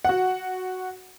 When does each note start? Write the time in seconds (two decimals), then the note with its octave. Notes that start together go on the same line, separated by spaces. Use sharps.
0.05 F#4 F#5